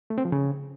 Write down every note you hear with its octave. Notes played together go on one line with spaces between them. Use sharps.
A3
C4
F3
C#3